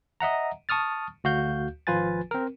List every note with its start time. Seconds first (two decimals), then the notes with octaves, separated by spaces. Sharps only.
0.20 D#5 E5 F#5 A#5
0.69 A5 C#6 D#6 F6 A6
1.24 D2 F#4 F5 G6
1.87 G#1 F3 F4 B4 G#5 A6
2.31 C4 A#4